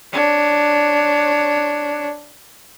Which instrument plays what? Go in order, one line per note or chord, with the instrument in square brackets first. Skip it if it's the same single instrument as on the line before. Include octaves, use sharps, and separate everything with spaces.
[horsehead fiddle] D4 C#5